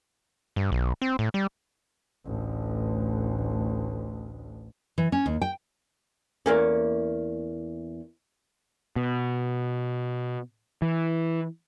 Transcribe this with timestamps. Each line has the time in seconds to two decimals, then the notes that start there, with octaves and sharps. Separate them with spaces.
0.56 G2
0.72 B1
1.02 C4
1.19 A2
1.34 G3
2.26 A1 D2
4.98 E3
5.12 C#4
5.26 D#2
5.42 G5
6.46 E2 A#3 C#4
8.96 B2
10.82 E3